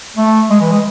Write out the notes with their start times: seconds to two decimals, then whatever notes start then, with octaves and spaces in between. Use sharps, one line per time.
0.16 A3
0.50 G#3
0.61 E3
0.72 G#3